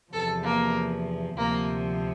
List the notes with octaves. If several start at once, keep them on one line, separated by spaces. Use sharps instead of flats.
E2 C3 F3 A4
A#3
D2 C3 F3 A#3